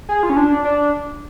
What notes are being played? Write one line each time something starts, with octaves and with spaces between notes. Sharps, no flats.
G#4
F4
C#4
D4
D4